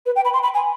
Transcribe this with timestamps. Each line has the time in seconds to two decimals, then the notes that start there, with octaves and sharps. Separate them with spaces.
0.06 B4
0.16 G5
0.25 B5
0.34 C6
0.43 B5
0.54 G#5